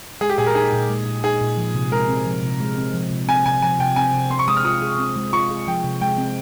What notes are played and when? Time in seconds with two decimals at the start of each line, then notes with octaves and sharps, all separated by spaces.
0.21 G#3 G#4
0.29 G4
0.38 A#2 G#4
0.46 A#4
0.55 D#4 G#4
0.72 A#2
0.90 G#3
1.06 A#2
1.24 D#4 G#4
1.41 A#2
1.57 F3
1.75 C3
1.92 G#3 A#4
2.09 C4
2.26 F3
2.43 C3
2.60 G#3
2.77 C4
2.94 F3
3.11 C3
3.28 C4 G#5
3.46 C3 G#5
3.62 F3 G#5
3.80 C3 G5
3.96 C4 G#5
4.14 C3
4.30 C4 C6
4.39 C#6
4.47 G#3 D#6
4.57 F6
4.65 F4 D#6
4.82 G#4
4.99 C4
5.16 G#3
5.33 F4 C#6
5.50 G#4
5.67 F3 G5
5.84 C3
6.01 G#3 G5
6.18 C4